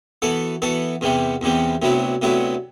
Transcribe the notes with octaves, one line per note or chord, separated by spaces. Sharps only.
E3 B3 F#4 A4
E3 B3 F#4 A4
E2 C3 E3 G3 B3
E2 C3 E3 G3 B3
D2 C3 F#3 B3 E4
D2 C3 F#3 B3 E4